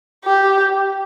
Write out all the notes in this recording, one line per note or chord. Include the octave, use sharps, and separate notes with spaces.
G4